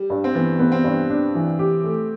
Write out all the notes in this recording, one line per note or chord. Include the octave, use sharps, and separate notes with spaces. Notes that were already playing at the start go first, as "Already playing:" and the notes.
Already playing: G3
G2
C4
E3 B3
B3
C4
G2
D4
E3
G4
A3